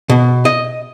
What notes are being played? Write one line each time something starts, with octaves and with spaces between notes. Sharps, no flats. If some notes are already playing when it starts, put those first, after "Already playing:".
B2
D#5